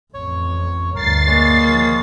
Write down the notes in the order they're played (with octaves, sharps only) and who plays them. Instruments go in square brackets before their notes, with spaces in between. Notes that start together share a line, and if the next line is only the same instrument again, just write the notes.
[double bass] A1 F2 [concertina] C#5
[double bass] D2 G2 [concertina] A#4 [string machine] A6 C7
[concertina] G#3 C#5 [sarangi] A#3
[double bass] D#3 F3